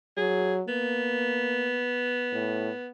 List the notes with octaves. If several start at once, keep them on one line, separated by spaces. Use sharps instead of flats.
F#3 G#4
A#3 B3
A2